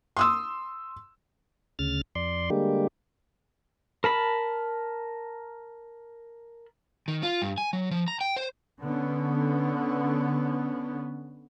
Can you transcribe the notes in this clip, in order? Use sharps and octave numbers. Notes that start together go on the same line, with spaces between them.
C6 D#6 E6
D2 C#3 F6 A6
F2 D5 C6
D3 G3 G#3 A#3 G4
A#4 A5 B5
D#3
F4
G2
G#5
F#3
F3
A#5
G5
C5
D3 B3 C#4